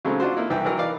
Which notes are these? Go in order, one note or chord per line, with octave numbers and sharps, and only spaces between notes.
C#3 F#3 G#3 A3 C4
D4 F4 F#4 C5
A#3 D#4 E4
C2 E3 E5 G5
E3 F#3 A#4
D#4 B4 D5 F5